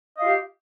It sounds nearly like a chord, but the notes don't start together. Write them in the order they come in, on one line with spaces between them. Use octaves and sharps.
D#5 F5 F4 G4